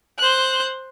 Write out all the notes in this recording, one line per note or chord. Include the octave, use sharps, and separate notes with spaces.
C5 F#6